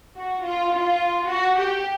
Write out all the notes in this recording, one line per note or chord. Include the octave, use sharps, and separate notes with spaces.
F#4
F4
F4
F#4
G4